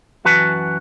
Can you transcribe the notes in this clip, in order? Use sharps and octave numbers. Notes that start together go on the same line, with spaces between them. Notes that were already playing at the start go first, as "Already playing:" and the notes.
F#2 E3 F#4 B4 A5